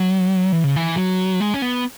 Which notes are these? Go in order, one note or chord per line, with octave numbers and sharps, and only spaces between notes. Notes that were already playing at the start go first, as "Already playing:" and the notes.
Already playing: F#3
E3
C#3
E3
F#3
G#3
C#4
B3